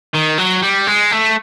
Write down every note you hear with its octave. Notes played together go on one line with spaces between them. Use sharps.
D#3
F#3
G3
G#3
A3